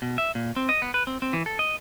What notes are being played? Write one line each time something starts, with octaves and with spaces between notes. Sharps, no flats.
B2
E5
A#2
C4
D#5
B3
B4
C4
C4
E3
A4
D#5